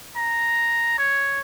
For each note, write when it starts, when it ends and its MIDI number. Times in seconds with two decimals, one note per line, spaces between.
0.16 0.96 82
0.98 1.40 73